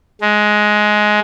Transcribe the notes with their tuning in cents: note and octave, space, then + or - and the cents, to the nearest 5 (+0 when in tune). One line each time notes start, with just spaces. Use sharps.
G#3 +15